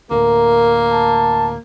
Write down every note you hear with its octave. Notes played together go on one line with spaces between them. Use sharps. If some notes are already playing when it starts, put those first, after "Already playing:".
D2 A2 A#3 A#4
A5